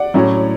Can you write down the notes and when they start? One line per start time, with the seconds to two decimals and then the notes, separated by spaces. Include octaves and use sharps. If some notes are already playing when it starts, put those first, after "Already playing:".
Already playing: D5 F#5
0.14 A2 F#3 C#4 E4